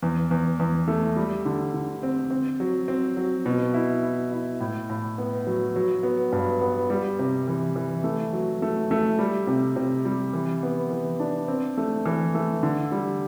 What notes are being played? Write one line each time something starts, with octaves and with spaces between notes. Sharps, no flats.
E2
E2
E2
A3
G3
D3
D3
C4
C4
F#3
C4
F#3
B2
E4
E4
E4
A2
A2
B3
F#3
F#3
B3
G2
B3
G3
C3
E3
E3
A3
F#3
A3
A3
G3
C3
C3
G3
E3
B3
E3
D4
C4
A3
E3
A3
D3
G3